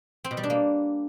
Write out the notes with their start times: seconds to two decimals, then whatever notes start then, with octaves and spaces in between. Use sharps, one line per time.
0.24 C4
0.31 B2
0.37 G3
0.43 D4
0.50 A#3